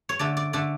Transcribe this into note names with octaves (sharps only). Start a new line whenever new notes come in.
C#5
D3 A3 D5
D5
D3 A3 D5